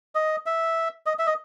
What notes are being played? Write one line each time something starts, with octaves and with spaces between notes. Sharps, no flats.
D#5
E5
D#5
E5
D#5